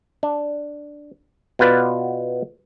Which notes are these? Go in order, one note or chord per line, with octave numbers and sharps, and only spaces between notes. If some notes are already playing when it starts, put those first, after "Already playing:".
D4
B2 B3 F4 B4 D5